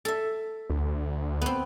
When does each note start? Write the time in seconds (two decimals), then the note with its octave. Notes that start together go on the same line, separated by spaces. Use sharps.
0.05 A4 E5
0.70 D2
1.42 B3 C4